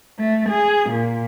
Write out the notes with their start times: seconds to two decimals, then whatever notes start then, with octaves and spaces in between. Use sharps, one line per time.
0.19 A3
0.50 G#4
0.90 A#2